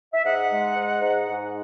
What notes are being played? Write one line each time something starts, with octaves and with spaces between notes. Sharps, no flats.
E5
G#2 D#5 F#5
G#3
G#2
G#2
G#2